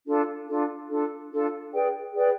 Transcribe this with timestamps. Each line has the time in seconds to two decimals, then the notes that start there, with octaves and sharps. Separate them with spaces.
0.06 D4 F4 A4
0.48 D4 F4 A4
0.89 D4 F4 A4
1.30 D4 F4 A4
1.72 G#4 B4 D5 G5
2.14 G#4 B4 D5 G5